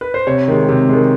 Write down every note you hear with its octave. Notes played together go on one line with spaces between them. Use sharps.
B4
C5
C3 C#5
D#3 G#3
C3
D#3 G#3